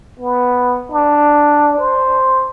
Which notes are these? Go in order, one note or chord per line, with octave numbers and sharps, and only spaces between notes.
B3
D4
C5